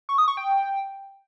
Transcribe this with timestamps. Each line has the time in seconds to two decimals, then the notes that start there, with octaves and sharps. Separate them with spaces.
0.09 C#6
0.18 D#6
0.28 C#6
0.37 G5